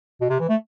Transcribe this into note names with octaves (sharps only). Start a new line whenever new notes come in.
B2
C3
E3
A3